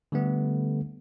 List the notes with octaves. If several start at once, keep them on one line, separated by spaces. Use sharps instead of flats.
D3 G3 A3 B3